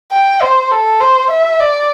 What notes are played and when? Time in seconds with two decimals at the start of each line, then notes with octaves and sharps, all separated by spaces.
0.12 G5
0.42 C5
0.71 A4
1.00 C5
1.30 E5
1.60 D5